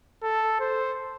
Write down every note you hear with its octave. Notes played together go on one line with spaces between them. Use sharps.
A4
C5